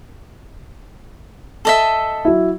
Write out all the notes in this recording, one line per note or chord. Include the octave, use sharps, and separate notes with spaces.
A4 D#5 E5
F#3 E4